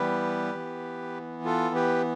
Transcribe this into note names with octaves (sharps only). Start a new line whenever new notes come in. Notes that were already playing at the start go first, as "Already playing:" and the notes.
Already playing: E3 G3 B3 G4 B4
E3 B3
F4 A4
G4 B4